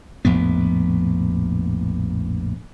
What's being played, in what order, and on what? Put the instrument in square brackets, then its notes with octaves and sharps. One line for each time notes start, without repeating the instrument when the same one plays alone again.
[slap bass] A#1 F2 A2 B3